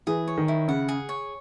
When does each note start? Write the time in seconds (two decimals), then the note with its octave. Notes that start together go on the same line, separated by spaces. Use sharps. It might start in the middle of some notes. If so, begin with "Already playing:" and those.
0.07 E3 G#4
0.28 C#5
0.38 D#3
0.48 E4
0.68 C#3 F#5
0.89 G#4
1.09 C#5